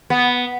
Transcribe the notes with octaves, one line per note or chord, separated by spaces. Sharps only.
B3